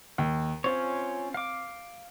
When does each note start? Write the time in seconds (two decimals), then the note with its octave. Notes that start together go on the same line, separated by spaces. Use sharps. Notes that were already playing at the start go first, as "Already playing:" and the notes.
0.18 D#2
0.64 C4 C#4 F4 C#5
1.34 F5 D6